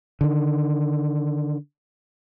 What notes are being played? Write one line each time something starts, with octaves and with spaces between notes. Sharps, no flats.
D3 D#3